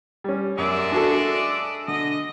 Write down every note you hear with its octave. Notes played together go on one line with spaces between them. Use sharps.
G3 C#4
F#2 G#3 D5 E5
D4 F#4 A4
D3 D#5